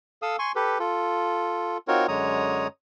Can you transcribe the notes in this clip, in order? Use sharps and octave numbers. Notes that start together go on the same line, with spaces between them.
A4 F5 D#6 E6
G#5 C6 C#6
G4 A4 B4
F4 A4
C4 D#4 F4 F#4 A#4 C#5
F#2 D3 G#3 C#5 A#5 D#6